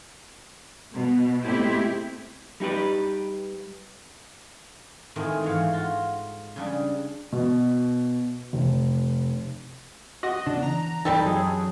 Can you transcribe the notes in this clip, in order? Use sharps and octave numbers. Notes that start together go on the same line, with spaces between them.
B2
G#3 A3 C4 E4 G4
G3 D#4 G4 B4
A2 D#3 G#3 A3 C4
G#2 E3 F#4 C#5 F5 F#5
F4 F#4
C#3 G3 D4
B2
F1
F#4 D#5
C#3 B3 D4
E3 A#5
F#2 E3 G3 C4 D#4 A4
F#3 G#4